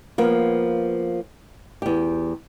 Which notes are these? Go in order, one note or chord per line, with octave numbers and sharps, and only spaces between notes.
F3 A#3 B3
E2 G4